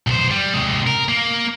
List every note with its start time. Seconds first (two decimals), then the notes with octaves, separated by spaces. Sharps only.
0.07 B1 C5
0.31 G3
0.54 C3 G#3
0.87 A#4
1.09 A#3